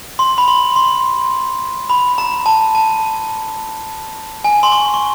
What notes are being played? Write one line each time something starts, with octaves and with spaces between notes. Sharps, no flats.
C6
B5
C6
C6
B5
A#5
A5
A5
G#5
C6
C#6
C#6